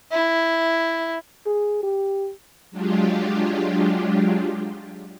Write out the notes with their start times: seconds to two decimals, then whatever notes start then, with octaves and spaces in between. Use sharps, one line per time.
0.12 E4
1.46 G#4
1.83 G4
2.71 F#3 G#3 D4 F4 G4